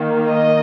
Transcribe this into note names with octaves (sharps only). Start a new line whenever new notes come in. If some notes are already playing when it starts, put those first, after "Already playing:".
Already playing: D#3 A#3
D#5